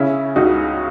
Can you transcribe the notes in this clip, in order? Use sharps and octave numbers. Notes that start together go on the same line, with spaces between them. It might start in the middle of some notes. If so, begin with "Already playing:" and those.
Already playing: C#3 C#4 E4
C#2 D#4 F#4